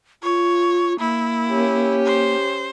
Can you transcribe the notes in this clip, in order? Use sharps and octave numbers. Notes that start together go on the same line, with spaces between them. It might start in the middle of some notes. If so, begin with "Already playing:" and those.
F4 C#5
A#3 E4
C#4 G4
C5